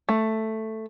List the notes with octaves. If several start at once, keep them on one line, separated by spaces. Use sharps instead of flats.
A3